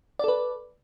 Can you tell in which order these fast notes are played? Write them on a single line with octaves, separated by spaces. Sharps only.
D5 A4 B4